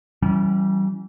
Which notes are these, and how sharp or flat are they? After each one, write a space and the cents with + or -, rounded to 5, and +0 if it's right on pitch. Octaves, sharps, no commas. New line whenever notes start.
E3 +0 G3 -30 C#4 +0